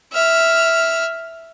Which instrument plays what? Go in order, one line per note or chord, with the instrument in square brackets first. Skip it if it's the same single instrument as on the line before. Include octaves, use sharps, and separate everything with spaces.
[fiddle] E5 F6